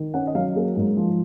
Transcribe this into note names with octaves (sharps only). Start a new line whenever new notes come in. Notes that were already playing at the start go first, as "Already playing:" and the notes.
Already playing: D#3
C#4 F#5
D#5
F#3 F5
A#3 G#4
G#2
F3